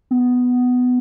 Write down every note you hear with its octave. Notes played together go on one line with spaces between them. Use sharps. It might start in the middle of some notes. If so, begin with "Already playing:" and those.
B3